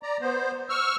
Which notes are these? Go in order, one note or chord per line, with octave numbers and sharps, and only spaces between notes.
D5 A#5
B3 C5
C#6 E6 F6